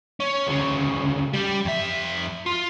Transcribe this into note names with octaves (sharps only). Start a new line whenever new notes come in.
C#4
D2 C#3
G3 G4
F2 E5
F4